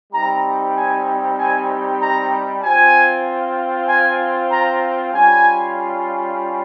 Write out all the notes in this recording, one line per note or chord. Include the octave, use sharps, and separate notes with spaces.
G3 C4 D#4 G4 A#5
G#5
G#5
A#5
C4 F4 G#5
G#5
A#5
G3 C#4 F4 G#5